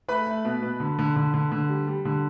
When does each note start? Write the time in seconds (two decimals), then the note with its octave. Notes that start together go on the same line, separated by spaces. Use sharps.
0.08 A3 B4 B5
0.27 A3
0.45 B2
0.62 B2
0.80 D3
0.99 D3
1.16 D3
1.34 D3
1.52 D3
1.69 G3
1.87 G3
2.05 D3